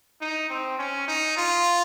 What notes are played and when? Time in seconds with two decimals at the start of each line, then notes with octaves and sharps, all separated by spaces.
0.21 D#4
0.50 C4
0.79 C#4
1.08 D#4
1.37 F4